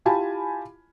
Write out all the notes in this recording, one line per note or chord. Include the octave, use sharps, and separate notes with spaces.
E4 F4 G4 G#5 A5 B5